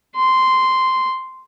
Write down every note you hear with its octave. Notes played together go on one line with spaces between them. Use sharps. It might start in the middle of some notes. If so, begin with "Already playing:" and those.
C6